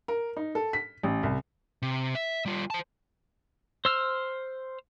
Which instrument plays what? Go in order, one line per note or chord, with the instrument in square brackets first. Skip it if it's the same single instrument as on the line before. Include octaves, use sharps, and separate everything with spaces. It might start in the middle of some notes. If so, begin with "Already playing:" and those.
[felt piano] A#4
D#4
A4
B6
A1
C2
[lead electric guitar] C3
E5
G3 F4
C5 A5
[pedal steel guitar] C5 E6 F6